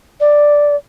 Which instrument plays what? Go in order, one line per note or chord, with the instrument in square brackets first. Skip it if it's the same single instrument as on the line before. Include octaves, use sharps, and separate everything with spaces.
[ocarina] D5